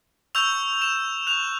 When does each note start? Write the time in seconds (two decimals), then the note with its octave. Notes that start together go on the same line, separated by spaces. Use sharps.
0.35 C#6 E6 G6 F7
0.82 E7
1.27 C#6 F#6 F7